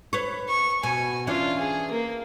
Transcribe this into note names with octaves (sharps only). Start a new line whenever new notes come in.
B4 C#5
C#6
B2 G#5
E3 C#4 D4 F4
G#4
A#3